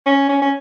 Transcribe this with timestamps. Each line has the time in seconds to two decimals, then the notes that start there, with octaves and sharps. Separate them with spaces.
0.06 C#4
0.29 C#4
0.42 C#4